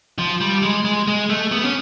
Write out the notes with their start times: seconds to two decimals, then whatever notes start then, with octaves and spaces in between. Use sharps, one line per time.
0.19 F3
0.41 G3
0.63 G#3
0.85 G#3
1.07 G#3
1.30 A3
1.52 B3
1.64 C#4